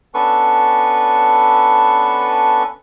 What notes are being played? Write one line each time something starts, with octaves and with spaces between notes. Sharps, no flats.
B3 C#4 D4 A4 B4 C#6